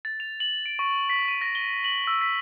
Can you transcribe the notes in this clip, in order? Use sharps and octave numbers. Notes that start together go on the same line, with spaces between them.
A6
F7
F#7
D7
C#6
B6
D#7
A#6
G7
F#7
E6
B6